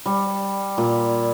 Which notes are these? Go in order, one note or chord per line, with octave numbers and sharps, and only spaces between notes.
G3
A#2